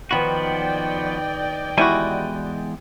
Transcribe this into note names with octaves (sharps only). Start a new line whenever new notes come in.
D#3 F3 B3 F#4 B4 D5 D#5 G5
E2 G3 G#3 E4 F#4 G#5